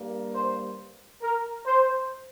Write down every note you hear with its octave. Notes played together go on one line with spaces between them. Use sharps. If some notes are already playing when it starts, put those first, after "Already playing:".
Already playing: G2 G3 A#3
C5
A#4
C5